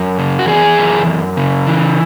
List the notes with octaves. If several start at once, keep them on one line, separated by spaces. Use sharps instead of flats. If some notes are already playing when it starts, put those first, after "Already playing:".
Already playing: F#2
C#3
F#4
E3 G#4
F#2
F#2
C#3
E3